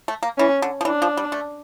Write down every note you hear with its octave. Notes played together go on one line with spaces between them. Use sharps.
A3
A#3
E3 C#4
D3
F3
E3 D4
F3
G3
A3